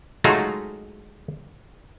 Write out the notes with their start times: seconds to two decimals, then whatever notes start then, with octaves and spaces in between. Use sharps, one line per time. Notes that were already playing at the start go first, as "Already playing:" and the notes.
0.24 F#3 G#3 A3 D#4 F4 F#4